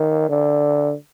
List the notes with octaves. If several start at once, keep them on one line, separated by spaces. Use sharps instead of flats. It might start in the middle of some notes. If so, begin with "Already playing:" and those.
Already playing: D#3
D3